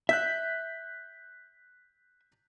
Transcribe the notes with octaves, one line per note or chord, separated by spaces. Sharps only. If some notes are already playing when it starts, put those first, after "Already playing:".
E5 F#6 G6 B6